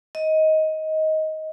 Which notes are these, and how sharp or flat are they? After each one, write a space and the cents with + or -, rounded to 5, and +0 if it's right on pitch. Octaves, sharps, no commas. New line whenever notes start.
D#5 +15